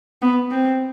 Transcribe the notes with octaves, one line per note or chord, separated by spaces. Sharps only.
B3
C4